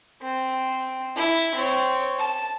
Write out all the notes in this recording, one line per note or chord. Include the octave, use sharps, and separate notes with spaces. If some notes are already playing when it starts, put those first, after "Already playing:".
C4
E4
C4 C#5
A5